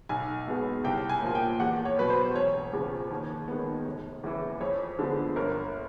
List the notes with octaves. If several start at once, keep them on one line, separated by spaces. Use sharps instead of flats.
B1 G#5
B2 G#3 B3
C2 G5
G#5
A#2 F3 A#3
G5
E2 F#5
C#5
B2 F#3 B4
C5
E1 C#5
E2 C#3 F3
D#2
D#3 G#3 B3
F1
E2 C#3 E3
F2 C#5
D3 F3 G#3 B3
G1 A#4